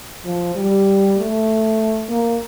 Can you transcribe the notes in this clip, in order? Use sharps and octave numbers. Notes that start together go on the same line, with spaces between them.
F3
G3
A3
A#3